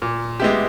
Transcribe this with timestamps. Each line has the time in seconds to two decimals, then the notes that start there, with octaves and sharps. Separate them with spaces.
0.02 A#2
0.40 G#3 B3 E4 G4